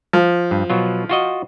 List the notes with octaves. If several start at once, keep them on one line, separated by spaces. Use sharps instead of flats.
F3
G2
B2 F#3 F4
F4 F#4 D#5